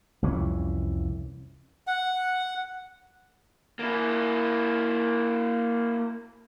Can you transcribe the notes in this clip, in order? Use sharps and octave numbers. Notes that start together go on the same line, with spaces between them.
C2 F2 E3 C#4
F#5
A#3 E4